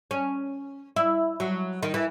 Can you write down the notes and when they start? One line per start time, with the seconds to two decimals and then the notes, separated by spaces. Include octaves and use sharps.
0.11 C#4
0.96 E4
1.40 F#3
1.83 D#3
1.94 E3